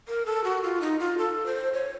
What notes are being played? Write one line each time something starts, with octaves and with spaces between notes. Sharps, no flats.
A#4
A4
F#4
F4
D#4
F4
A4
C5
C#5